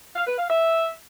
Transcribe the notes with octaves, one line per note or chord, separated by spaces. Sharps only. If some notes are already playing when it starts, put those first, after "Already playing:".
F5
B4
F5
E5